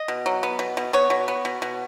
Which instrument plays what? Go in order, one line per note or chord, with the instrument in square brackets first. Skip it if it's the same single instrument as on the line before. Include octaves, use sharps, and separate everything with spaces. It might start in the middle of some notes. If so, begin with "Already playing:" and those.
Already playing: [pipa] D#5
B2
F#3
B3
B2
B2
B3 C#5
B2
B3
B2
B2